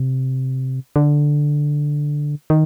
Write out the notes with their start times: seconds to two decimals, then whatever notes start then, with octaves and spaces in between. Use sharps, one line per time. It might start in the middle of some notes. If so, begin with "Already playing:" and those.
Already playing: C3
0.96 D3
2.50 D#3